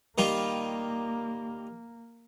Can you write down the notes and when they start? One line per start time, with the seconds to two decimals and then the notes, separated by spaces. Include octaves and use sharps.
0.18 D#3 G3 A#3 F4